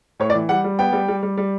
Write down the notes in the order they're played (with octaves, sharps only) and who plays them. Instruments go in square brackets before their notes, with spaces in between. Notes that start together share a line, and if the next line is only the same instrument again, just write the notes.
[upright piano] A2 C#5
D5
E3
G3 F#5
G3
B3 G5
G3
G3
G3
G3